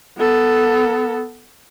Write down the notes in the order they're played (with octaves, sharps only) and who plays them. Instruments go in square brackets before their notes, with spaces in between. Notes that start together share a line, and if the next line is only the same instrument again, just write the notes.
[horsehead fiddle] B3 A4